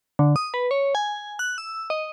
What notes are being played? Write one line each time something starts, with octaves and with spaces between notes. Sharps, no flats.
D3
D#6
B4
C#5
G#5
F#6
E6
D#5